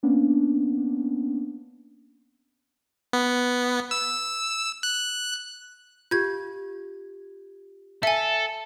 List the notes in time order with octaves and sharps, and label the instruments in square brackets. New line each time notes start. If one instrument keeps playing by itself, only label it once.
[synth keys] A#3 B3 C#4 D4
[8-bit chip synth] B3
E6
F#6
[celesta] F4 G4 [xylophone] G6 G#6
[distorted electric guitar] A4 [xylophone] E5 G#5